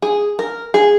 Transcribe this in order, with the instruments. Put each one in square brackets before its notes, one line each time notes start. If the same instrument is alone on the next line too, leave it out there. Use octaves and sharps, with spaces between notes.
[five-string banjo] G#4
A#4
G#4